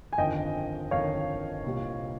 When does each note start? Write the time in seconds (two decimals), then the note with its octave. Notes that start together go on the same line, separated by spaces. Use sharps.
0.13 G#5
0.18 G1 F2 D#3 D#5 G5
0.91 G1 F2 D#3 C#5 F5
1.64 C2 A#2 G3